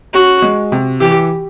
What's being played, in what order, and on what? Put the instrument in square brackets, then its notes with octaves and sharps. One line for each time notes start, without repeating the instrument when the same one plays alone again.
[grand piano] C#4 [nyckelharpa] F#4
[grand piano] G#3
C3
[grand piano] E3 [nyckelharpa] G4